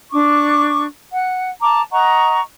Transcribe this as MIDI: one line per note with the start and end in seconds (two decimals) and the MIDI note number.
0.11 0.85 62
0.11 0.85 85
0.11 0.85 86
1.13 1.49 78
1.62 1.81 81
1.62 1.81 82
1.62 1.81 86
1.92 2.41 75
1.92 2.41 78
1.92 2.41 82
1.92 2.41 85